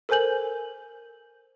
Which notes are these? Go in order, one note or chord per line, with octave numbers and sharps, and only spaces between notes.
A4 A#4 C5 G#5 G6 F#7